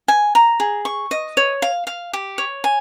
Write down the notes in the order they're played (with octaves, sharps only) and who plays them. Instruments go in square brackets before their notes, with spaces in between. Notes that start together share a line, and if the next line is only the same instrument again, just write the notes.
[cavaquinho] G#5
A#5
G#4
C#6
D#5
C#5
F5
F5
G4
C#5
G#5